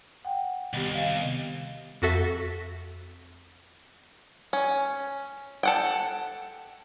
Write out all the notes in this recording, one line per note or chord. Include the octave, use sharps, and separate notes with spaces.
F#5 G5
C2 D#3 B3 G4
D#5 F5
F2 F#4 A4 E5
C#4
A4 F#5 G5